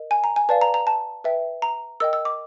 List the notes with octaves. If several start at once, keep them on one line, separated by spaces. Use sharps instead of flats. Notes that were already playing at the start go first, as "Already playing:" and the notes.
Already playing: A#4 D#5
G#5
A#5
G#5
B4 D5 F5 A5
A#5
A#5
A5
B4 E5 G5
A#5
A#4 D#5 G5 E6
E6
D6